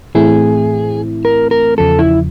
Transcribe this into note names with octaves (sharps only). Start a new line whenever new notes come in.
A2 E3 A3 C4 E4 G#4
A#4
A#4
E2 C#3 F3 A4
E4